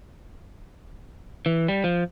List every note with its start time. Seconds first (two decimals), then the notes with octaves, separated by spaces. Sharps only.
1.46 E3
1.68 G3
1.84 F3